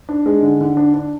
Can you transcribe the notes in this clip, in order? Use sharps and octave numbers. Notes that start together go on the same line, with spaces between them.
D4
G#3
D3
D3
D4
D4